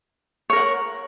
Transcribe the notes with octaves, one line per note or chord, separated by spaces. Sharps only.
A#4 C#5 F#5 C#6